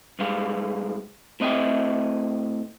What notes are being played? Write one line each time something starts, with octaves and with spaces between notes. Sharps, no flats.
B1 G2 G#3 F5
A2 C4 D#5 E5 G5